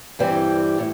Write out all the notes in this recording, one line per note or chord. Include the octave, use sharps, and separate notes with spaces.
G2 E3 G3 C4 E4
A2